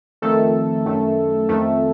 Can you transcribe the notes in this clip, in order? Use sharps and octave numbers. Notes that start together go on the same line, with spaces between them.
F2 D#3 A3 A4
F#2 D#3 A3
F2 D#3 A3